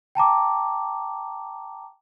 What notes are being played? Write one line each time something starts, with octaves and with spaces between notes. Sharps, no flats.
G5 A5 A#5 D6